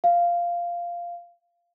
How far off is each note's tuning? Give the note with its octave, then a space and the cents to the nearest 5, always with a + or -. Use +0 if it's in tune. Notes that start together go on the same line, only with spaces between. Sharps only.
F5 -5